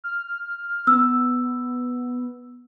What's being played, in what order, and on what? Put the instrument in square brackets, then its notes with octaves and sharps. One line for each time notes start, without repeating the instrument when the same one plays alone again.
[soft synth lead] F6
[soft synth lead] B3 [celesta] E6